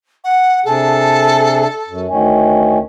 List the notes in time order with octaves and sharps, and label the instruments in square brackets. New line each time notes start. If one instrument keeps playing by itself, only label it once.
[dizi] F#5
[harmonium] C3 D4 G#4 [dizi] A4
[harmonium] F#2
D2 D#3 C#4